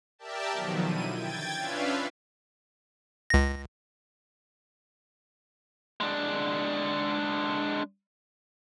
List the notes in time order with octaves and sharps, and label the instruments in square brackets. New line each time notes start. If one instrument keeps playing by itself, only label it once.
[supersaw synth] G4 A#4 D5 E5 G5 A5
B2 D#3 F3 F#3
D3 E4 D#7
G5 G#6 A6
C#4 D4 F4 B4 E5 F5
[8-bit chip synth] C#2 A#6
[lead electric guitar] G#3 D4